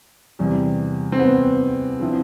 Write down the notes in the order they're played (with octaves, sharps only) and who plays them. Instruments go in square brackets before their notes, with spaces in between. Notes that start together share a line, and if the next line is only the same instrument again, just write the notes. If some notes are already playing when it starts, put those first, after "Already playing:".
[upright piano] E2 C3 G3
[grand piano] C4
B3
[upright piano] D3 F3 C4 E4